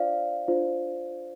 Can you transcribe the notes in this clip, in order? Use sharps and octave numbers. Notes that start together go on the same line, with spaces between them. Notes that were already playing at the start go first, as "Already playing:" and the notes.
Already playing: D4 F4 C5 D5 F5
D4 F4 C5